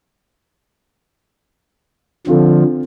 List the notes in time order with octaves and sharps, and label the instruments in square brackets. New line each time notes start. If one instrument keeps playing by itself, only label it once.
[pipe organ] D3 F3 [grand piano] C4 F4 A4